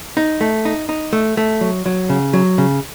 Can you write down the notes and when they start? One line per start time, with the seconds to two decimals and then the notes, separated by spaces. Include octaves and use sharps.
0.17 D#4
0.41 A3
0.65 D#4
0.89 D#4
1.13 A3
1.37 A3
1.61 F#3
1.86 F#3
2.09 C#3
2.33 F#3
2.58 C#3